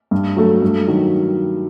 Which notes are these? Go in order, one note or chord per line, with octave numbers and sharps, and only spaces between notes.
G2
F#3 A3
G2
D#3 F#3